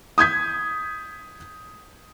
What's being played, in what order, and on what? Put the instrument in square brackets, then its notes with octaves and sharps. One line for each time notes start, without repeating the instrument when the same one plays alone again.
[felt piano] D#6 G6 G#6 B6